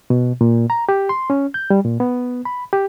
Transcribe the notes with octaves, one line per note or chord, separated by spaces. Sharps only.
B2
A#2
A#5
G4
C6
C#4
G6
G3
A#2
B3
B5
G4